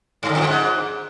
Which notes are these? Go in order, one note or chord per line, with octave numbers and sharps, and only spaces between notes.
G2
D3
E2
F3
G#2